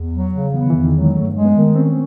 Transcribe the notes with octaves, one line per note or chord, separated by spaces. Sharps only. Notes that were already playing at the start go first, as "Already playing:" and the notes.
Already playing: E2
F#3
C#3
E3 B3
D#3
E3
E2
D3
D#3
F#3
G#3
G2 A3
G#3
B3
D#3
C4 C#4